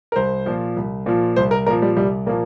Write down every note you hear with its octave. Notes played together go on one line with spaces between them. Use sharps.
A#4
C2 C5
A#2 F3
C2
A#2 F3
C2 C5
A#4
A#2 F3 A#4
G3
C2 G3
A#2 F3 A#3